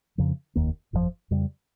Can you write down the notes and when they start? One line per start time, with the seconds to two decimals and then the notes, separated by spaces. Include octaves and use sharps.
0.18 F2 C#3 F3
0.55 F1 D#2 D#3 A#3
0.93 G1 F2 C3 F3
1.31 F2 C#3 G3